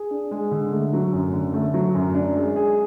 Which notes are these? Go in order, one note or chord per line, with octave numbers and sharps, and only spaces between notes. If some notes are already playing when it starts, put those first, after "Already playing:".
Already playing: G#4
D4
G#3
D3
A3
F#3
F#2
D3
A3
F#3
F#2
D4
G#3
G#4